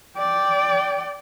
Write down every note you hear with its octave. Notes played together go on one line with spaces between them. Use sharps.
D5 G5